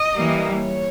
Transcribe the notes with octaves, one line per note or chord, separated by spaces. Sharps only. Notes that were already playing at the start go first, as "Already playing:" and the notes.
Already playing: D#5
E3 G3 A#3
C#5